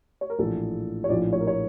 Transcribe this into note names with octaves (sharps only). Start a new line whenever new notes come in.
C#5
A#4
A#1 A2 E3 A4
C#5
A#1 A2 F3 D5
C#5
A#4
C#5